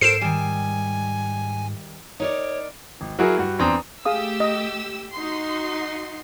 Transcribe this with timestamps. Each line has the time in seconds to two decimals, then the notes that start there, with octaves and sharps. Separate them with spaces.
0.01 G#2 A4 A#4 C5 C7 D7 E7
0.21 D#3 G3 G#5
2.20 D#4 A#4 C#5 D5
3.01 G#1
3.19 F#3 E4 F#4 G#4 A#4
3.38 G2 F#4
3.59 E2 C4 D4 C5 A#5 D#6
4.05 A3 G4 G#4 F5 D#6 E6
4.40 D#5
5.12 D#4 F#4 C6